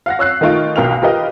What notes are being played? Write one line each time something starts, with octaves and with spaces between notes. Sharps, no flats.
F5 F#5 A#6
C#5 E6 F#6 C7
D#3 A3 D#4 F4 C#6 D7
B1 B2 A#4 F5 G5 F7
F4 G4 A#4 B4 D#5 F5